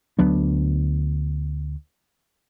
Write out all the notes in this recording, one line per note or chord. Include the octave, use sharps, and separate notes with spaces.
D2 F#3 B3 D4